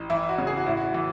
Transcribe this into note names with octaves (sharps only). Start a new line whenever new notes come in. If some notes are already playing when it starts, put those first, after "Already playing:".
Already playing: A1
E3 E4
F#4
C#3
G#4
F#4
A2 E4
F#4
E3